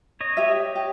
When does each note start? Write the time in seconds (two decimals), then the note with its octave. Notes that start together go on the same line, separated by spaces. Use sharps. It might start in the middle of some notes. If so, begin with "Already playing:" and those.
0.21 C#5 D#5
0.37 G4 E5
0.75 G4